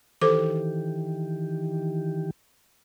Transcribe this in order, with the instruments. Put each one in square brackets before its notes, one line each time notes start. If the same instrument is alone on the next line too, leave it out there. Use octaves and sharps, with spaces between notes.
[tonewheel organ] D#3 E3 G4 [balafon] A4 C5 D6